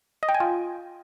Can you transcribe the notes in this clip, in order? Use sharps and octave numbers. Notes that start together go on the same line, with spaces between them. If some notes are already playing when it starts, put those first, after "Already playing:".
D#5
G5
G#5
F4